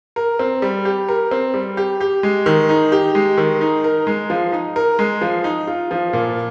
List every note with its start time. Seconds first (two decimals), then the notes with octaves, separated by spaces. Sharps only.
0.16 A#4
0.39 C4
0.62 G3
0.85 G4
1.08 A#4
1.31 C4
1.54 G3
1.77 G4
2.01 G4
2.23 G#3
2.46 D#3
2.69 D#4
2.92 G4
3.15 G#3
3.37 D#3
3.61 D#4
3.84 A#4
4.07 G#3
4.30 F3
4.52 D#4
4.76 A#4
4.99 G#3
5.21 F3
5.44 D#4
5.67 F4
5.91 F3
6.13 A#2